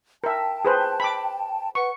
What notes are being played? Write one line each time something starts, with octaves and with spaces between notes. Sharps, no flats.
A#4 E5 G5 A5
G#4 B4 C5
B5 D6
B4 F#5 C#6